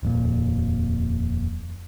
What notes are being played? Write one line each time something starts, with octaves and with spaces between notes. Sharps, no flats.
D#1 F2 A#2